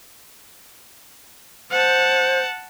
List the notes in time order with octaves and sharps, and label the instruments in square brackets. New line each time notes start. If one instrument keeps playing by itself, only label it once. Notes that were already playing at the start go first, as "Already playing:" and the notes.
[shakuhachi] C5 [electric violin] F#5 A5